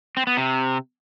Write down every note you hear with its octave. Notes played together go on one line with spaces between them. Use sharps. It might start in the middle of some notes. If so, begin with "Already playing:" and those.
C4
B3
C3